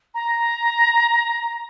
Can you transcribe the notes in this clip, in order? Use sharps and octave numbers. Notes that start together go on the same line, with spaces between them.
A#5